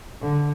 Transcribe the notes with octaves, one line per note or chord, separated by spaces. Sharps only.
D3